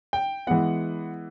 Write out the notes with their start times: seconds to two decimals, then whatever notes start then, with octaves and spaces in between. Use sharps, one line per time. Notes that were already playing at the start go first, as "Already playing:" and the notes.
0.13 G5
0.47 E3 G#3 B3 F#5